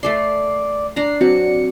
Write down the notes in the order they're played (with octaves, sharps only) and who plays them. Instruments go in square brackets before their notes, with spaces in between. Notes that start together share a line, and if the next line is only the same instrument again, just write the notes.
[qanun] A3 A4 C6 [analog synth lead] D5 [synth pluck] C7
[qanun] D4 D5 A#5 [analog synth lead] C7
[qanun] F#3 [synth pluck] C4 F#4 D5 [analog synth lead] C#7